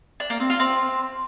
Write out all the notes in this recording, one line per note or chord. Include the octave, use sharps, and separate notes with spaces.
D4
A#3
C4
F4
C4